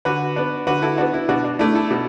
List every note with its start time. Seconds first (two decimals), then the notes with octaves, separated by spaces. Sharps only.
0.05 D3 F#4 B4
0.36 B3 D4
0.67 D3 F#4 B4
0.82 E4 A4
0.98 B3 D4 F#4
1.13 E4
1.29 B2 D4 F#4
1.44 D4
1.59 A3 D4 E4
1.74 E4 A4
1.91 B2